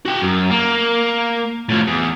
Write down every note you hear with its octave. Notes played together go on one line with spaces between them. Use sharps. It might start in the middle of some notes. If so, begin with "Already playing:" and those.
F#4 G5
F#2
A#3
A2 F3
E2